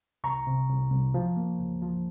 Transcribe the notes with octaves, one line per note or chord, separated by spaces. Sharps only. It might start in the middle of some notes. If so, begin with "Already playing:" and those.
C2 A#5 C#6
C3
C2
C2
F3
A#3
C#2
F3